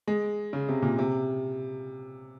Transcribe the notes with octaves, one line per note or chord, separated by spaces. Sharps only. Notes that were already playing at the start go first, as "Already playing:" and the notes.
G#3
C#3
C3
A#2
C3